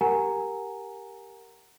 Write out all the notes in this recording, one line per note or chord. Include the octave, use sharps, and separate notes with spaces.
G4 A#4 F#5 G#5 A#5